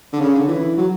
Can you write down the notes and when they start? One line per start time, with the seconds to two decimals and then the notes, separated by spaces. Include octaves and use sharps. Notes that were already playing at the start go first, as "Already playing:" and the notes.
0.13 D3
0.20 C#3
0.35 D3
0.48 E3
0.77 F#3